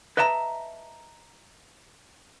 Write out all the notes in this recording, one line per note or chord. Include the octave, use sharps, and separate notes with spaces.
B4 D#5 E5 A5 A#5